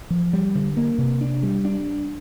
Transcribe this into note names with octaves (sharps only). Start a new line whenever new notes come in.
F3
G3
D3
A#3
C3
D4
G3
D4